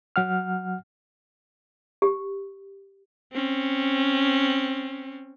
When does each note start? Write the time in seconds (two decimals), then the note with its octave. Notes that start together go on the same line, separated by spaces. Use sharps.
0.16 F#3 F#5 F6
2.02 G4
3.33 C4 C#4